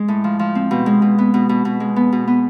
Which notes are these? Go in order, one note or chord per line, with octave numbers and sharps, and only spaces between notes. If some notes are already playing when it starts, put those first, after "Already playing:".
Already playing: G#3
A2
F3
F3
C4
B2
G#3
B2
B3
B2
B2
B2
G#3
B3
B2
B3